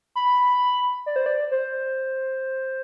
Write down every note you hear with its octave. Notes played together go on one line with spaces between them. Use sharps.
B5
D5
C5
D5
C5